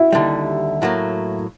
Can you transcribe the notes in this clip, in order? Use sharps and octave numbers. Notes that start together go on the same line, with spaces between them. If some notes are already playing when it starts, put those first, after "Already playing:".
Already playing: E4 F#4
D#2 D3 G3
A2 F#3 A#3